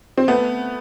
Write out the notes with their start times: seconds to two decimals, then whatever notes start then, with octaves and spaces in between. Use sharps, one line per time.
0.18 C4
0.28 A3 B3